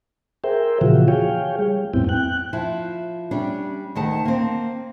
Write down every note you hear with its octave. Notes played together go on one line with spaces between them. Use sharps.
G#4 A#4 C5 E5 G5
A#2 C#3 E3 F3 F4 F#4
G#4 C#5 F5 G5
G3
F2 A2 B3 C4 E4 G5
G5 F#6
F3 E4
G3 C#4 D4
D2 D#3 F#5 A5
A#3 C4